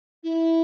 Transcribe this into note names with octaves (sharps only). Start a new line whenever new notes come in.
E4